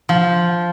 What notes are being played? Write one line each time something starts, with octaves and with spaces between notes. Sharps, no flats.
F3